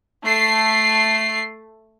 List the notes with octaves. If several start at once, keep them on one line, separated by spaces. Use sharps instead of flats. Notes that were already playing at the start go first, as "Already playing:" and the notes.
A3 C7